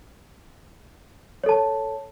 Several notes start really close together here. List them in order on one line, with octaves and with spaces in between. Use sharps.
C#5 A4 A5